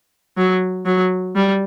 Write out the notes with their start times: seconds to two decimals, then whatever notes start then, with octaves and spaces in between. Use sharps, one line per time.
0.37 F#3
0.86 F#3
1.36 G3